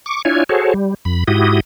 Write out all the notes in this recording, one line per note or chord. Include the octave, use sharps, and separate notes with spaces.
C#6 D6
D4 E4 F4 C#5 G#5
F#4 G#4 A4 C5 C#5
G3
F2 B5
G#2 E4 F#4 G4 D#6